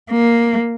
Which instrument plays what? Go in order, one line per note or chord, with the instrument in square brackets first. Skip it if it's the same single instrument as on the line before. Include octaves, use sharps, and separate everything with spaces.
[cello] A#3